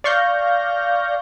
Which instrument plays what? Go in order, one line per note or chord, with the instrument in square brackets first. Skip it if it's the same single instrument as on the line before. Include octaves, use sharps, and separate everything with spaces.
[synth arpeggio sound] D5 F5 C#6 F6 G6 A#6